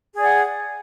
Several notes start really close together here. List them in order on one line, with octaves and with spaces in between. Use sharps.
G#4 D5 F#5